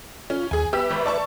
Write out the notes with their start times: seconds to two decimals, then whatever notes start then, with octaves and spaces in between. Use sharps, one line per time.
0.30 C#4 F4
0.51 D#2 G#4 G#5
0.73 B3 G4 B4 E5 B5 E6
0.90 G#1
1.06 D5 A5 C#6